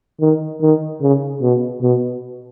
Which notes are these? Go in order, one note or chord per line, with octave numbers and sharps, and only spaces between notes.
D#3
D#3
C#3
B2
B2